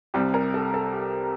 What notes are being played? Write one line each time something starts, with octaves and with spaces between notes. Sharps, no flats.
C2 C3 G3 G4
A#4
A4
A4
G4